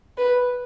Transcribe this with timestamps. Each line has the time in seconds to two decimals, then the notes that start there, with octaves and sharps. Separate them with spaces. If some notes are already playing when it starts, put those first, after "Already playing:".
0.18 B4